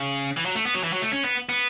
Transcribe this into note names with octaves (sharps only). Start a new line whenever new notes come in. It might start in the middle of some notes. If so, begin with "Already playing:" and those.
Already playing: C#3
E3
F#3
A3
B3
F#3
E3
F#3
A3
C#4
B3
B3